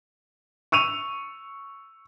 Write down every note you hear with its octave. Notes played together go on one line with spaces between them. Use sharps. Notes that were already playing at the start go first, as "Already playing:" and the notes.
C#6 E6 D#7 F7